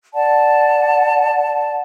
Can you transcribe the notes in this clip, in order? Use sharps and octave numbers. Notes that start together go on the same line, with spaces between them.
D5 F#5 A5